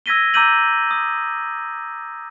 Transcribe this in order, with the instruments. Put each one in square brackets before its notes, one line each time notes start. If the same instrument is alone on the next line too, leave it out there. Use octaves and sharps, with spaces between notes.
[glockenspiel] E6 G#6 A#6 B6 D#7 G7
A#5 D6 E6 G6 D#7 F#7
D#6